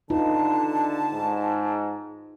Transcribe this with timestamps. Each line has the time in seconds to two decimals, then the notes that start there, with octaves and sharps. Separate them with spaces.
0.10 D3 D#4 F4 B4 A5
1.13 G#2